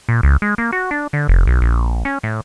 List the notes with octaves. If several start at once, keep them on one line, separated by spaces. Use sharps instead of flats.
A#2
C#2
G#3
A#3
F#4
D4
D3
F1
B1
A#1
C#4
A2